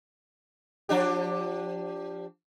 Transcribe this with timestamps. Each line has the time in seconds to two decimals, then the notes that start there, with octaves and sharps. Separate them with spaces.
0.89 F3 D4 G4